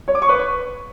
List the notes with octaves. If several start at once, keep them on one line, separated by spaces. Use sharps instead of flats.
C#5
D6
C#6
B4